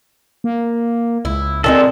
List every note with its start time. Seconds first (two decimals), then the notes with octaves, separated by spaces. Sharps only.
0.44 A#3
1.25 C#2 E4
1.64 A#2 D#3 G#3 C4 A4 D5